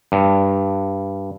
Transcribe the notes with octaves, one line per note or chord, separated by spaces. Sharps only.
G2